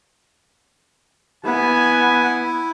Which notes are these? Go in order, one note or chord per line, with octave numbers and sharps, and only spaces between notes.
B3 E4 G#5